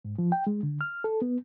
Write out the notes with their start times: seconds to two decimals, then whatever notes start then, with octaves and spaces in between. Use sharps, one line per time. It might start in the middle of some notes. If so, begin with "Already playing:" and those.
0.05 G#2
0.18 F3
0.32 G5
0.47 G#3
0.63 D3
0.81 F6
1.04 A4
1.22 B3